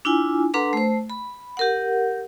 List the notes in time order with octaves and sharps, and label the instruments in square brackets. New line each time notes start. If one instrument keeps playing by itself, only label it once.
[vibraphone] D4 E4 F4 G#5
D4 A4 B4 F#5 A#5 C6
A3 C5
B5
G4 A#4 F#5